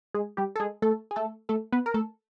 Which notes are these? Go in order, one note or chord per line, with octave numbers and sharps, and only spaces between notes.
G#3 G#4
G3 G4
A4
G#3 G#4
A3 A4
G#4
A3 A4
A3 A4
B3 B4
A#4
A3 A4